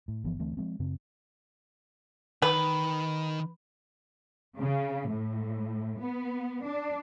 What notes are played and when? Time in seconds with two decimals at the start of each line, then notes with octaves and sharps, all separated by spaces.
0.08 A2
0.24 G1 E3 F3 B3
0.39 D2 E3 A3 C4
0.57 F3 G#3 C4
0.79 F#2 C#3 C4
2.42 D#3 B4
4.59 C#3
5.11 A2
6.01 B3
6.66 D4